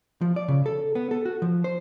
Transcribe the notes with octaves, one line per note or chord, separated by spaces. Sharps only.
F3
D5
C#3
A4
B3
A4
F#4
F3
C5